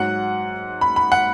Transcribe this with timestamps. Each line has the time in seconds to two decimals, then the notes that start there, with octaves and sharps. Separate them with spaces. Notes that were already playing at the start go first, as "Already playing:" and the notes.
Already playing: G#2 F#3 F#5
0.81 B5
0.96 B5
1.12 F#5